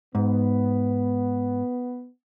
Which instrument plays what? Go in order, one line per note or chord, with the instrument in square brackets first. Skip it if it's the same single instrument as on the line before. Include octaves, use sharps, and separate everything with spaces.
[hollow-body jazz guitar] G#2 [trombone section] B3